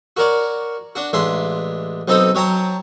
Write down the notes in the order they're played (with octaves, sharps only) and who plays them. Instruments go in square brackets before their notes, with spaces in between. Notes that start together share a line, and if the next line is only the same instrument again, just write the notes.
[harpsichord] F#4 A#4 C#5 D5
D4 F#4
A1 G#3 D4 E5 C6
B1 C4 D#4 A4 A#5 D#6
F#3 C#5 G5 A5 A#5